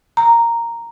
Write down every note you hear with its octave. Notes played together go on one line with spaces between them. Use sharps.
A#5